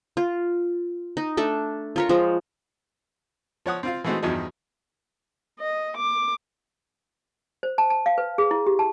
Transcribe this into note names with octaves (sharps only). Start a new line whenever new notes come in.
F4
D#4
A3 D4 A4
F4 A#4 C#5
F3 G#3 A#4
F3 C#5 F#5 D#6
C4 F4 F5
E3 G#3 A3 C4 D#4 F#4
E2 G2 F3 F#3 D#4
D#5
D6
C5
A5
A5
F5
B4
G#4
E4
G4
A5